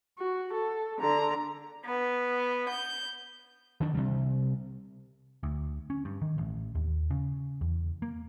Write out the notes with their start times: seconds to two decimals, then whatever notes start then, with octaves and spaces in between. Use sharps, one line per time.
0.18 F#4
0.54 A4
1.00 D3 A#5
1.86 B3
2.68 G6
3.80 D#3 D4
3.94 C3 G3
5.43 D2
5.90 C#4
6.05 G2
6.22 D#3
6.38 A1
6.75 D#2
7.11 C#3
7.61 E2
8.02 A#3